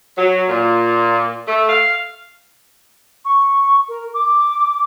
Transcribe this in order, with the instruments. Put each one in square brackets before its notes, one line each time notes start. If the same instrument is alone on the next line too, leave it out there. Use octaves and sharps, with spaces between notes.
[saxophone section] F#3
A#2
A3
F5
[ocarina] C#6
A#4
D6